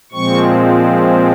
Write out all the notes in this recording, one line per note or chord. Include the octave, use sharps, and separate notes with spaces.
A#2 F3 G#3 C4 C#6